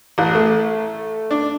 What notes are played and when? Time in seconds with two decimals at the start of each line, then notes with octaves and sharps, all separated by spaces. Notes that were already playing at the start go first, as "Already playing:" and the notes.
0.18 A1
0.35 A3
1.31 D4